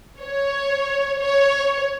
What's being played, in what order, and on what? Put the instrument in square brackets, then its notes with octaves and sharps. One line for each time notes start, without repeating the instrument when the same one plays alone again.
[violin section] C#5
C#5